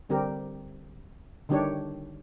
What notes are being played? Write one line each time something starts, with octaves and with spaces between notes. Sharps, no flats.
D3 G3 C4 G4 A#4
D3 D#3 G3 D4 G4 C#5